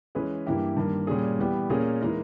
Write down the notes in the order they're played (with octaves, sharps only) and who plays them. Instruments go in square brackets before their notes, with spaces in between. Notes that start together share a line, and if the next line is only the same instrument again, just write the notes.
[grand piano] E3 G#3 C#4 G#4 B4
G2 E3 A#3 E4 G4
G2 D#3 A#3
A#2 G3 C#4 G#4
E3 G3 B3 G4
A#2 A#3 C#4 G#4
E3 G#3 D#4 A#4